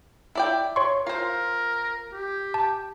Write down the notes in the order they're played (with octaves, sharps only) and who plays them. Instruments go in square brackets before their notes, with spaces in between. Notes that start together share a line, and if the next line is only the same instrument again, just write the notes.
[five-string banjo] E4 D5 G5
[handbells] C#5 C6 C#6
[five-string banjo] F4 C5 [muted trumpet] A#4
[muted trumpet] G4
[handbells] A5